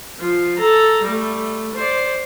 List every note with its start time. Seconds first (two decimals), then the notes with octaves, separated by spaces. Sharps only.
0.19 F3 F4
0.58 A4 A#5
1.03 G3 A3
1.75 C5 D5